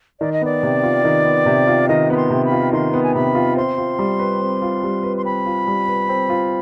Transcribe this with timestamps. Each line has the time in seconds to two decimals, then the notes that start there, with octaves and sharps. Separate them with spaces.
0.20 D#3 D5
0.33 D#5
0.42 B3 D5
0.63 C3
0.83 F4
1.04 D#3
1.25 B3
1.46 C3
1.67 F4
1.89 D#3 D#5
2.10 B3 B5
2.16 C6
2.30 C3
2.45 B5
2.51 F4
2.72 D#3 C6
2.94 B3
3.03 G#5
3.15 C3 B5
3.35 F4
3.57 C4 C6
3.78 F4
3.99 G3
4.19 B4
4.41 C4
4.62 F4
4.83 G3
5.03 B4
5.17 C6
5.25 C4 B5
5.46 F4
5.67 G3
5.88 B4
6.09 C4
6.30 F4